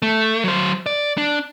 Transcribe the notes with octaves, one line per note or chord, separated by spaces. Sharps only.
A3
F#3 C5
D5
D4